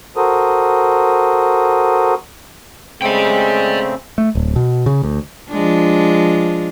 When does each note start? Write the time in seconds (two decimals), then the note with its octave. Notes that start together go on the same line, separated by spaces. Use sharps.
0.16 F#4 A4 A#4 C5 D#6
3.02 C#3 G#3 A3 C4 D5 G5
4.18 A3
4.35 D1
4.56 B2
4.86 C#3
5.03 D2
5.50 F3 G#3 D4